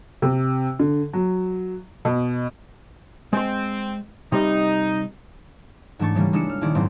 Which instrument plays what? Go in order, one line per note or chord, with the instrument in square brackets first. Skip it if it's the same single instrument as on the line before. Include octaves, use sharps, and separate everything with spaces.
[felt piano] C3
D3
F#3
B2
[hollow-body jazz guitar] G#3 C6 [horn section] C4
[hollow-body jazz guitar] C3 G3 [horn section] D#4
[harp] G#2 E3 A3 D4 C#6 A6
C#3 E3 G3 A#3
G#3 D4 E4 E6 C#7 D#7
F6
A#1 D#3 E4 G#4 D5
F#1 G#2 C4 F4